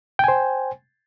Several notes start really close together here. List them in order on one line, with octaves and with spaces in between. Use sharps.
G5 G#5 C5